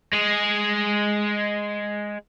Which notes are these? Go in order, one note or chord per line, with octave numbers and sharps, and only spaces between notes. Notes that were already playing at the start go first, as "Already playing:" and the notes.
G#3 G#4